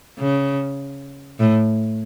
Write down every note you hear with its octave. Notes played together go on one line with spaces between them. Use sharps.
C#3
A2